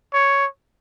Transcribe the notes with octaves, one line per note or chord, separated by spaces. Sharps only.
C#5